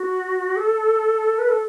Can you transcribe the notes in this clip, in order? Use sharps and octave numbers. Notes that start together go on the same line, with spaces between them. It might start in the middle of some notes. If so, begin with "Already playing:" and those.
Already playing: F#4
A4
B4
A4